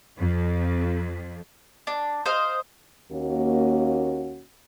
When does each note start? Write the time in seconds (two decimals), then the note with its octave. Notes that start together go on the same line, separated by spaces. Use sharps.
0.17 F2
1.87 D4
2.26 C5 D#5 F5
3.10 D#2 A#3 C#4 F#4